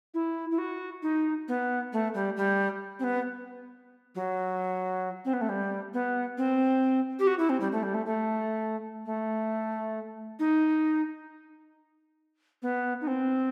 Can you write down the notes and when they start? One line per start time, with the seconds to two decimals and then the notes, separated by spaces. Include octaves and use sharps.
0.14 E4
0.51 E4
0.58 F#4
1.03 D#4
1.48 B3
1.93 A3
2.14 G3
2.37 G3
2.99 C4
3.04 B3
4.15 F#3
5.25 C4
5.33 B3
5.41 A3
5.49 G3
5.94 B3
6.38 C4
7.19 G4
7.27 F#4
7.39 E4
7.50 C4
7.60 G3
7.72 A3
7.83 G3
7.94 A3
8.06 A3
9.06 A3
10.39 D#4
12.62 B3
13.01 D#4
13.07 C4